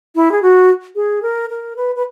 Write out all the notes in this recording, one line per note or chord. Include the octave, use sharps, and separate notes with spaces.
E4
G#4
F#4
G#4
A#4
A#4
B4
B4